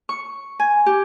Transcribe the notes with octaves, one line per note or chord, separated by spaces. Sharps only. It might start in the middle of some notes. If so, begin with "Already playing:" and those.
C#6
G#5
G4